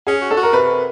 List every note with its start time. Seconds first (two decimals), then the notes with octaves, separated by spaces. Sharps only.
0.06 C#4 G#4
0.22 F#4
0.31 A4
0.37 F#4
0.43 A#4
0.53 C3 B4